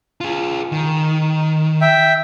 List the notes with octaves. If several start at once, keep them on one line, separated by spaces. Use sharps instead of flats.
F4 G#4
D#3
E5 G5